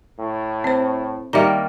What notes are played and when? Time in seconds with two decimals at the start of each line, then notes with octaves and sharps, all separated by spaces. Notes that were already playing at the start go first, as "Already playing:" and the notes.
0.19 A2
0.64 C4 C5
1.33 D#3 G3 A#3 E5 A#5